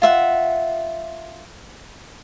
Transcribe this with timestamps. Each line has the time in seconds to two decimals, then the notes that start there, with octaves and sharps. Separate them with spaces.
0.02 F4 E5 F#5